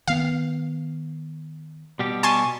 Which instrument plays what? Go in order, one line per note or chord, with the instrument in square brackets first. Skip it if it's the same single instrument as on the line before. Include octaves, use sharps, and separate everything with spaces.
[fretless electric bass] D#3 B3 [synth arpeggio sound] F5
[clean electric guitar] B2 G3 G4
[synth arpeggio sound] G#5 A5 C6 [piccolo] C#6